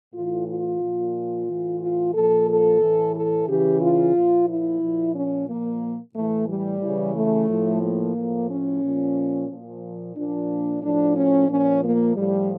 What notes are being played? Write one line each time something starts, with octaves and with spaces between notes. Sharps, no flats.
A2 E3 F4
F4
A#2 F3
A2 E3
F4
A#2 F3 A4
A4
A2 E3
A4
C#3 E3 G4
F4
A#2 F3
E4
A#2 F3
C#4
A#2 F3 A#3
A2 E3 A3
G3
C#3 E3
A3
A2 F3
A#3
A2 F3
C#4
A#2 F3
A#2 F3
A#2 F3 D4
A2 F3 D4
C#4
A#2 F3 C#4
A#3
A2 F3 G3